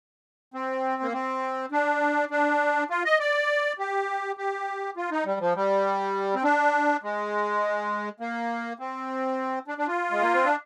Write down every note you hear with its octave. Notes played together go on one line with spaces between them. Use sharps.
C4
A#3
C4
D4
D4
F4
D#5
D5
G4
G4
F4
D#4
G3
F3
G3
C4
D4
G#3
A#3
C4
D4
D4
F4
G#3
A#3
C4
D4